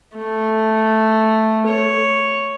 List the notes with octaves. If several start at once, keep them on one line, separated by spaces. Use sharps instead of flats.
A3
C#5